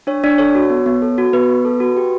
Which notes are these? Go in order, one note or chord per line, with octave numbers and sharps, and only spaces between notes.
D4 C#5
D4 D5
A4 C#5
F#4
B3
B3
A4
F#4
B3 B4
B3
A4
F#4
G4